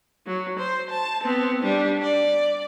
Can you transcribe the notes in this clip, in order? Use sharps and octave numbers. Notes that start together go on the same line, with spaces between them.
F#3
C5
A5
B3 C4
G3 D4
D5